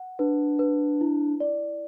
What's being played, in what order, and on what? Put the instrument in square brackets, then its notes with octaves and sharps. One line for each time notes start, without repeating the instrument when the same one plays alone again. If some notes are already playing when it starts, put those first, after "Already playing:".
Already playing: [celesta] F#5
[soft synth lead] D4 [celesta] B4
[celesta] B4
E4
D5